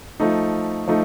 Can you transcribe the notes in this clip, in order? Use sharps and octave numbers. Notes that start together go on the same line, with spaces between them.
F3 A3 D#4
F3 A3 D#4